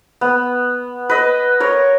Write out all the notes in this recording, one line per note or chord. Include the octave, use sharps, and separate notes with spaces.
B3
B4 D#5
A#4 C#5